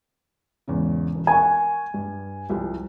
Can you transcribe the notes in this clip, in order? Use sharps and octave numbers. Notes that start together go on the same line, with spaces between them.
E2 G#2 C#3
E1
A#4 F#5 G#5 C#6
G2
C2 F3 G3